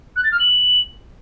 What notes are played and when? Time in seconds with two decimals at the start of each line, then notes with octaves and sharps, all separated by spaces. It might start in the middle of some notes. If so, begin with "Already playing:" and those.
0.16 F#6
0.24 A6
0.32 F6
0.40 F#7